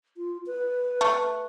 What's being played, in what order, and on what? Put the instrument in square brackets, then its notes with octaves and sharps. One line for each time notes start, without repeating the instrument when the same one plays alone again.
[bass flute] F4
B4
[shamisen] A3